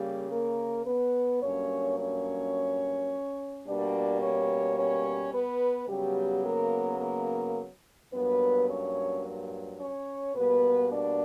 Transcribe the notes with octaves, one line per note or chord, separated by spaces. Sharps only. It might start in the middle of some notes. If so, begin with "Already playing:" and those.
Already playing: C#3 G3 A#3 G4
A#3 A#4
B3 B4
G2 F#3 A#3 C#4 C#5
C#4 C#5
B2 G3 A#3 D4 D5
C#4 C#5
C#4 C#5
B3 B4
C#3 F#3 G3 B3 G4
A#3 A#4
A#3 A#4
G2 F#3 A#3 B3 B4
C#4 C#5
C#4 C#5
B2 G3 A#3 B3 B4
D4 D5